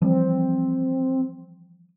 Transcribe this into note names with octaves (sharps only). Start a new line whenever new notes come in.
E3 F3 G3 C4